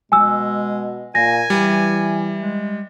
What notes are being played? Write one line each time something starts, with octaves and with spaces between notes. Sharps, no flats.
B2 G#3 G#5 E6
A#2 G#5 A#6
E3 G3
G#3